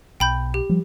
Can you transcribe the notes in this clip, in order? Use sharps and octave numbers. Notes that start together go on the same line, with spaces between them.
B1 G5 B5 G6
G4
F3 G3